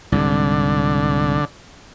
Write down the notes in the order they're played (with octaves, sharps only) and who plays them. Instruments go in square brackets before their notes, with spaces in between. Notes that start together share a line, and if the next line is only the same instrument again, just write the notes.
[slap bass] C2 G#2 [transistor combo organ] D3